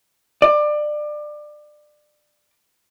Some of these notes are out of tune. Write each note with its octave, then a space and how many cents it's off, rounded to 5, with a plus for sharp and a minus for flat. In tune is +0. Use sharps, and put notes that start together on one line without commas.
D5 +25